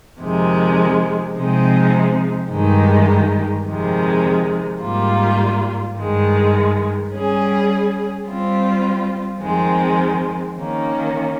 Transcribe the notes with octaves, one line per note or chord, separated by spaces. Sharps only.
F2 C3 D#3 G#3
C3 F3 G#3 C4 D#4
G2 D#3 G#3 D#4 G4
F2 C3 D#3 G#3
G#2 G3 A#3 F4
G2 D#3 G#3
G3 C#4 G#4
G3 C4 F4
F2 D#3 G#3 C4
D#3 A#3 C#4